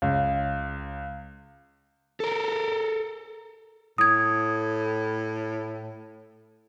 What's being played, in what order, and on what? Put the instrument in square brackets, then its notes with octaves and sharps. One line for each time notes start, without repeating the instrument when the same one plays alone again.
[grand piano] C#2
[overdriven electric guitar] A4 A#4
[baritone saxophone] A2 [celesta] D#6 G#6